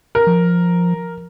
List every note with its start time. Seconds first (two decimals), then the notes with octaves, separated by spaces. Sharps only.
0.15 A#4
0.27 F3